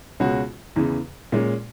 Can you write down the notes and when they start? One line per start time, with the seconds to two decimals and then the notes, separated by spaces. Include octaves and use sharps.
0.20 C#2 B2 G#3 C#4 F#4
0.76 E2 C#3 E3
1.32 A#2 G#3 C#4